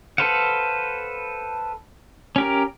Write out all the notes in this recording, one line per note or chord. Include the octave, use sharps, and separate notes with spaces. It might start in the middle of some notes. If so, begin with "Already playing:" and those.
A4 B4 C5 F5 F#5
C#4 G4 A#4